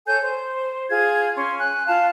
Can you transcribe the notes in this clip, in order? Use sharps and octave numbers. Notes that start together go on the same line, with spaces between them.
A4 C#5 G#5 G6
C5
F4 G#4 G#6
C#4 C6
G#5 F#6
F4 F5 A5